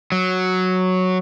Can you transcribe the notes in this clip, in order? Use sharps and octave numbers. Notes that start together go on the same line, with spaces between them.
F#3